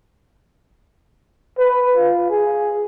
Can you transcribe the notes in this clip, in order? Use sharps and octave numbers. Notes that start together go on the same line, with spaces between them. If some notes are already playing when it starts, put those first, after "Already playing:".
B4
F4
G#4